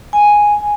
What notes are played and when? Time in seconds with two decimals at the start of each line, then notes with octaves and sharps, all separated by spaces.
0.13 G#5